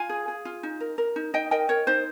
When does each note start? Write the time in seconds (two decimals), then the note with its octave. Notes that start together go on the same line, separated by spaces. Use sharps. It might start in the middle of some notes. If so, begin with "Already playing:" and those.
Already playing: F4 F5 G#5
0.09 G#4
0.28 G#4
0.45 F4
0.63 D#4
0.80 A#4
0.98 A#4
1.16 D#4
1.33 D#4 D#5 G5
1.51 A#4 D#5 G5
1.69 A#4 C#5
1.87 D#4 C5